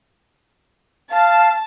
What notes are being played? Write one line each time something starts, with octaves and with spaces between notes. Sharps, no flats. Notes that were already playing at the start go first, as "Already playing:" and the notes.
F5 A5